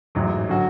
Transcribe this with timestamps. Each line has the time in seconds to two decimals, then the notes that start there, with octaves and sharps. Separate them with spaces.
0.15 A1 G#2 F#3
0.48 D3 F#3 C#4 F#4